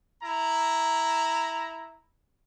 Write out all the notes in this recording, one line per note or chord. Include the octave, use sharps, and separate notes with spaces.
E4 A#5